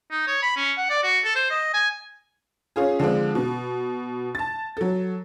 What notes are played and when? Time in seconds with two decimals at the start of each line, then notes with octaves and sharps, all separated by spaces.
0.11 D#4
0.27 C#5
0.42 B5
0.56 C#4
0.77 F#5
0.90 D5
1.03 F#4
1.24 A4
1.35 C5
1.50 D#5
1.74 G#5
2.76 C#4 F4 G#4
3.00 D3 F3 G#3 C4
3.35 B2
4.35 A5 A6
4.77 F#3 A4